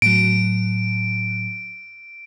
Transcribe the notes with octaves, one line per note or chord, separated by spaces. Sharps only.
A2 F#3 D7